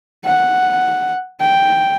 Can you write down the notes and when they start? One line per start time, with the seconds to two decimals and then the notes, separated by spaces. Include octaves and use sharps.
0.25 F#5
1.40 G5